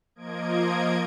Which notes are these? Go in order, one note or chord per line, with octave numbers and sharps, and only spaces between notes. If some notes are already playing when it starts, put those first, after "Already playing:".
F3 A#3 D#5 G#6 D7